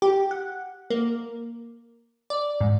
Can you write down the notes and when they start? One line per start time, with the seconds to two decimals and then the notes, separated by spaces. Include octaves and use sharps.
0.02 G4
0.31 F#5
0.90 A#3
2.30 D5
2.61 G#2